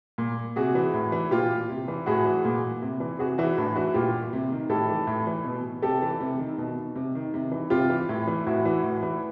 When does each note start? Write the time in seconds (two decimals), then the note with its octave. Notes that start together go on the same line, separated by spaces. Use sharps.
0.18 A#2
0.56 C3 F#4 G#4
0.75 E3
0.94 A2
1.12 E3
1.31 A#2 F4 G4
1.69 C3
1.88 E3
2.06 A2 F#4 G#4
2.25 E3
2.45 A#2
2.82 C3
3.00 E3
3.19 C3 F#4 G#4
3.38 E3 E4 F#4
3.57 A2 D4 E4
3.75 E3 E4 F#4
3.94 A#2 F4 G4
4.33 C3
4.52 D#3
4.69 A2 G4 A4
4.89 E3
5.07 A2
5.27 E3
5.45 B2
5.82 C3 G4 A4
6.02 E3
6.20 C3
6.39 D#3
6.58 B2
6.96 C3
7.15 D#3
7.34 C3
7.51 E3
7.70 C3 F4 G4
7.90 E3
8.09 A2
8.27 E3
8.46 A2 E4 F#4
8.65 E3
8.83 A2
9.02 E3